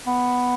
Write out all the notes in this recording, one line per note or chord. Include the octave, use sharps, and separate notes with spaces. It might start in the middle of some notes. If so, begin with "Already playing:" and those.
B3